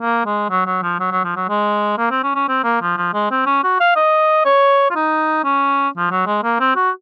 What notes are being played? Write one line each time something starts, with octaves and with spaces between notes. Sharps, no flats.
A#3
G#3
F#3
F#3
F3
F#3
F#3
F3
F#3
G#3
A#3
C4
C#4
C#4
C4
A#3
F3
F3
G#3
C4
C#4
F#4
F5
D#5
C#5
F4
D#4
C#4
F3
F#3
G#3
A#3
C4
F#4